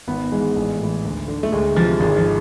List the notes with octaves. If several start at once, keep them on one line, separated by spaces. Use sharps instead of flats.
G#1 B3
G#2 E3 G#3
A1
A2 E3
D2
D3
A3
D2 G#3
C3 E3 F3
G#1 G#3
F3